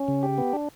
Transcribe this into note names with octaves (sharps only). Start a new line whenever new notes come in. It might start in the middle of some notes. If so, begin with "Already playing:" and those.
Already playing: C#4
C#3
G4
B3
D4